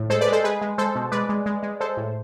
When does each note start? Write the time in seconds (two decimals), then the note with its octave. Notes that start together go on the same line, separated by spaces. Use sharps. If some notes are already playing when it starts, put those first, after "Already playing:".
Already playing: A2
0.10 G#3 A4 C5
0.21 B4 D5
0.28 G#3 A4 C5
0.44 G#3 G#4 B4
0.61 G#3
0.78 G#3 A4 C5
0.95 B2
1.12 G#3 B4 D5
1.29 G#3
1.46 G#3
1.63 G#3
1.80 G#3 A4 C5
1.97 A2